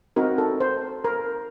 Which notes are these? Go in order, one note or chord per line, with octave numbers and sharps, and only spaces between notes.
C4 D#4 F#4 A#4
A4
C5
A#4